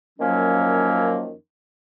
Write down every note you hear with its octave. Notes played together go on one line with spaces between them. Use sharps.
F#2 D#3 F3 F#3 A#3 C#4